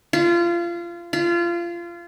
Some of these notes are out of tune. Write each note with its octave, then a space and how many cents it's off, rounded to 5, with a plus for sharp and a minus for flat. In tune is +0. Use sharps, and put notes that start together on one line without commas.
F4 -25
F4 -25